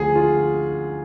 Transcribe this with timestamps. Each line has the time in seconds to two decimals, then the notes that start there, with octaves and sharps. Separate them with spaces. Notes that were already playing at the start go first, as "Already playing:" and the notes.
Already playing: D2 D3 F3 G#4
0.15 F4